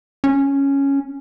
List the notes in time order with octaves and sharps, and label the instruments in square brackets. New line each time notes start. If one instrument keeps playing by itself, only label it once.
[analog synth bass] C#4